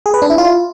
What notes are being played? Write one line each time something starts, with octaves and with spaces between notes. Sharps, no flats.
G#4
B4
D4
E4
F4